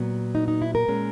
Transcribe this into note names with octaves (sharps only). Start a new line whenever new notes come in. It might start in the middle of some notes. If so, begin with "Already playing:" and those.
Already playing: A#2 F#3 B3
D#4
D#4
E4
A#4
A#2 G#3 C#4